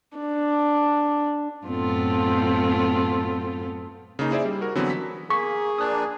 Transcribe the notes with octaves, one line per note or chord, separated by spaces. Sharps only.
D4
F#2 A2 B3 C4 F4 A4
C#3 A#3 D#4
E4 G#4 C5 D5 E5
G3
F#4 A#4
D3 E3 F#3 B3 C4
B6
A#3 G#4 C#6 B6
F3 A#3 D4 D#6 F#6